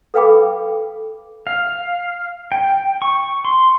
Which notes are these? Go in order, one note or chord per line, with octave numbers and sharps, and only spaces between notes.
A4 B4 F5 G5 B5 D6
F5
G5
C#6
C6